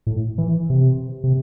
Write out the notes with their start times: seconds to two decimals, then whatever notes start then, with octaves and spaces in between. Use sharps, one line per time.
0.07 A2
0.38 E3
0.70 C3
1.24 C3